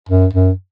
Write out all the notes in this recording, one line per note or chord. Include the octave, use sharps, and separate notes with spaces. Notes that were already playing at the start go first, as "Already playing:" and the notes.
F#2
F#2